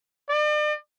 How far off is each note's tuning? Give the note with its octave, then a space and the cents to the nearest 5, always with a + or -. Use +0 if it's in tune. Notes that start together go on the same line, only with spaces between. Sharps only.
D5 +40